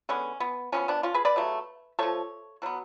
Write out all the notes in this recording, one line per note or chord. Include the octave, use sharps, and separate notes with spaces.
D3 G#3 B3 C#4
B3
F3 G#3 B3 C#4
B3 D4
C#4 F4
G#4 B4
B4 D5
C#3 F#3 A3
F3 A3 A4 C#5
B2 F#3 B3